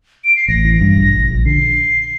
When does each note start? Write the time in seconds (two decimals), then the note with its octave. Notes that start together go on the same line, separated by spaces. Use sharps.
0.24 D7
0.36 C7
0.48 A1 A#6
0.65 E3
0.81 G2
0.97 A#1
1.13 A#1
1.30 A#1
1.46 D3 C7